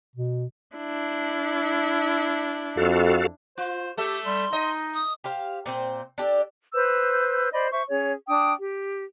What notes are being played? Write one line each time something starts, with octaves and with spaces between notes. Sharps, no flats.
B2
D4 E4
F2 F#4 A4 F5
F4 C5
A3 G4 A4 E5
G3 C6
D#4 D#5
D#6
G4 C5 F5
A#2 C4 C5
D4 G4 A4
B4 C5 E6 G6
C5 D5 D#5 B5
C5 E5 C#6
C#4 G#4 C#5
D4 G5 D#6
G4